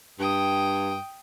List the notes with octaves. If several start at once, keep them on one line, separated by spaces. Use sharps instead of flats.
G2 G5 D#6